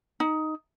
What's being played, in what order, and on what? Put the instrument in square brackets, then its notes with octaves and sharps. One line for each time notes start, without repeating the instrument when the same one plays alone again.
[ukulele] D#4